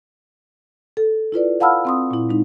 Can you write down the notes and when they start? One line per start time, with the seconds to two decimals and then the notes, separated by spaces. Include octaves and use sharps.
0.97 A4
1.32 E4 F4 B4 D5
1.60 F5 F#5 A5 B5 E6 F6
1.85 C4 C6 D#6
2.11 A#2 E4
2.29 G#3 D#4